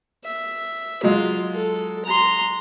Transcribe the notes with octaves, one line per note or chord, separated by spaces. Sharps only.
E5
F#3 G#3 F4
A4
A#5 C6